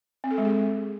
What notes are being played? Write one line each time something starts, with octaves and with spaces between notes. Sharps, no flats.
C4
A4
G#3
G#4